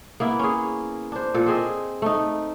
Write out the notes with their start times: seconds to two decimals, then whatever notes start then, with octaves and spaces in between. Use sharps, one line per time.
0.20 A#3 B3 E4
0.39 C#4 G#4
1.12 D4 C5
1.34 A#2 A4
1.46 C4 G#4 D#5
2.02 A3 D#4